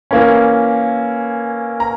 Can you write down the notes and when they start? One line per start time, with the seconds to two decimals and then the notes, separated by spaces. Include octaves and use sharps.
0.11 E3 A#3 C#4
1.80 A#5